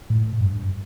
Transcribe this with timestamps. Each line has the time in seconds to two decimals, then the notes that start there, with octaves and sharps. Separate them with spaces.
0.10 A2
0.41 G2